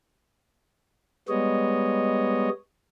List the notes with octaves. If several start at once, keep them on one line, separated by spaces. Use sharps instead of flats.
G3 G#3 B3 C#5 D#5